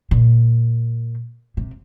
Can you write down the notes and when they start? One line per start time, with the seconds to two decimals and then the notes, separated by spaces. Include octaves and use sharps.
0.11 A#2
1.57 C3